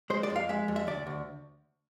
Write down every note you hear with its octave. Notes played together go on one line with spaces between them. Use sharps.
G#3 C5
D5
F2
F5
G#3 E5
F2
E5
D2 D5
D2